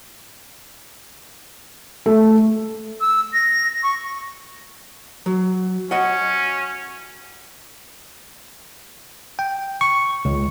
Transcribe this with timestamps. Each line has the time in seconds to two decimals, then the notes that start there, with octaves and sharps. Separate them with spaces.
2.06 A3
3.01 E6
3.33 A#6
3.83 C#6
5.26 F#3
5.91 C#4 F#4 D#5 F#5
9.39 G5
9.81 C#6
10.25 C#2